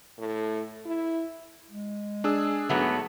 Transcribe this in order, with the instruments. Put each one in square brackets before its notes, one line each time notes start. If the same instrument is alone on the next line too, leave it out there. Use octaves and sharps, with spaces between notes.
[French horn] A2
E4
[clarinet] G#3
[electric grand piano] D4 G#4 E6
[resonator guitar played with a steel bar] G#2 F#3 A3 [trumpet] B3